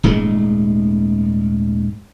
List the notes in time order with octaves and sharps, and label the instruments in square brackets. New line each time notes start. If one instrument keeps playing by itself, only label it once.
[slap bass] D#1 G#2 G#3 A3